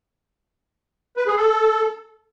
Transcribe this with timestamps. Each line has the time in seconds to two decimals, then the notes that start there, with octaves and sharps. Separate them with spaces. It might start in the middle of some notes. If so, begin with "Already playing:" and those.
1.17 B4
1.27 G#4
1.37 A4